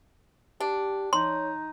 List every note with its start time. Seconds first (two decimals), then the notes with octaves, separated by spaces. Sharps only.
0.60 D4 G4
1.13 D#4 C#5 C6